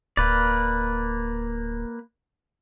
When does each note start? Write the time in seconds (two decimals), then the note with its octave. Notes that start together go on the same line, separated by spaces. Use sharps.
0.17 D1 A#3 B4 D5